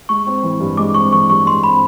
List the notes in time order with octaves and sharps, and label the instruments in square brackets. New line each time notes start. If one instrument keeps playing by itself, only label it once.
[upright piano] G#3 [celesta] C#6
[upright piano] C4
E3
G2
[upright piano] G#3 [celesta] D6
[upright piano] C4 [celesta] C#6
[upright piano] E3 [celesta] C#6
[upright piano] G2 [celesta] C#6
[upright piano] G#3 [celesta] C6
[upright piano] C4 [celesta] B5